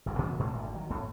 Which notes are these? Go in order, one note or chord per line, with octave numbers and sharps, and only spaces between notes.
G1 F2 G#2
A#2 C#3 E3 A#3
A2 D3 A3 B3
G#1 D2 B2 D3
D#3 F#3
F2 A2 A3